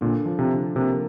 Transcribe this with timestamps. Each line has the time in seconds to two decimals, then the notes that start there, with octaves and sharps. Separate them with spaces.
0.01 A#2 D3
0.26 F3
0.39 C3
0.51 D3
0.76 C3 A#3